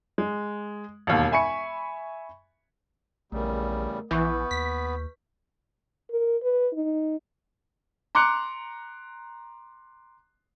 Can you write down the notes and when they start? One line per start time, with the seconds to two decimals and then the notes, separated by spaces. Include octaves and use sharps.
0.18 G#3
1.07 E1 D#2
1.32 E5 G#5 B5 C#6 C#7
3.32 A#1 E2 C#3 G3 A3 A#4
4.11 A#1 E3 B3 B4 C#6 G6
4.51 D#2 B6
6.10 A#4
6.43 B4
6.73 D#4
8.15 A#5 C6 D6 F#6 C#7